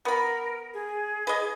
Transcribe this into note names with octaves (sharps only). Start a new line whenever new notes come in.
B3 A#4 B5
G#4
B4 D#5